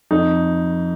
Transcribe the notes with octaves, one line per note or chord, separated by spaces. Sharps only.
F2 D#4